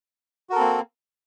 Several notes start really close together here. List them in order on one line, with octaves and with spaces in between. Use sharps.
F#4 A#4 A4 C4 A#3